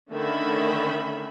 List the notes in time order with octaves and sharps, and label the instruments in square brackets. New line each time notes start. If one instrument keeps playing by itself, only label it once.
[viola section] D3 D#3 A3 C#4 E5 B5